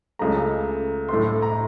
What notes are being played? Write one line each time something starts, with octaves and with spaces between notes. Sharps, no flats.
C#2 C#3 A3 A#5
A2 A3 C6
A#5